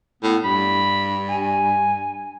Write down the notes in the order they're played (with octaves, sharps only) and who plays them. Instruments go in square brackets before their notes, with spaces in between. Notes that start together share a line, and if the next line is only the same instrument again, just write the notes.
[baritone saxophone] A2 [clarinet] B3
[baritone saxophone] G2 [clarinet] B5
[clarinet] G#5